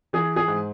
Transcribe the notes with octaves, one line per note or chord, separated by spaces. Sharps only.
E3 G#4
G#4
G#2